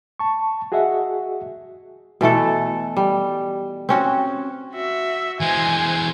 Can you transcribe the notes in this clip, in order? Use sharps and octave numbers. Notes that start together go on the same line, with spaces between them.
A5 C#6
F#4 G#4 D#5 E5 F#5
B2 E3 A3 A4
G3
C4 C#4 F#4
F#4 E5
E3 G#3 C5 G#5